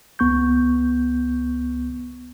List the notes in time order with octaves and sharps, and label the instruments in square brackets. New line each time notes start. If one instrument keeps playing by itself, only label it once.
[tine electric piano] C#2 B3 C#6 G6